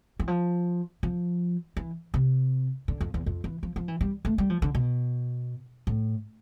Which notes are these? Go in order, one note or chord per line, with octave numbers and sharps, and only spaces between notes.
E3
F3
F3
E3
C3
D3
F2
E2
F2
E3
F3
F3
E3
G3
A3
G3
F3
D3
B2
A2